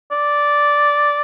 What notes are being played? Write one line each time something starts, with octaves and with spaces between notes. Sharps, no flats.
D5